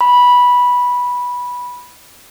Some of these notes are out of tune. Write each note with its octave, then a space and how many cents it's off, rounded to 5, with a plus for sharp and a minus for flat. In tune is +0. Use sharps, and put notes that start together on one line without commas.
B5 -10